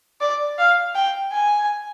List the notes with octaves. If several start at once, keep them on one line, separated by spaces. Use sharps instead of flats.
D5
F5
G5
G#5